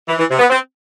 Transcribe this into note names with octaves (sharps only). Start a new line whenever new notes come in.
E3
E3
C3
B3
C4